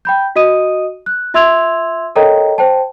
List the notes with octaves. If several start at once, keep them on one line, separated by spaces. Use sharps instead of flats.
G5 B5 G6
F#4 D#5 D#6 D#7
F#6
F4 E5 C6 E6 G#6 F7
A4 A#4 C#5 D#5 G5 A#5
C5 G5 A5